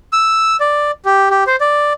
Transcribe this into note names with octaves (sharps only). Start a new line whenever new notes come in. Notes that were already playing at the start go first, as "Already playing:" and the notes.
E6
D5
G4
G4
C5
D5